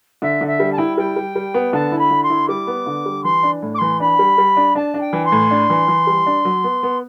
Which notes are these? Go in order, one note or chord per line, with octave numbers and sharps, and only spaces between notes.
D3 E5
D3
E5
G3
A5
E4 G5
G3 G5
G3
G3
B3
D3 A5
E4
B5
D3
C6
E4
G3 D6
B3
D3
G3
E3 C6
D4
A2
D6
E3 C6
D4 B5
G3
G3
D4
D4 A5
D4
G5
E3
C6
A2
D4
E3
E3
G3
D4
F#3
B3
B3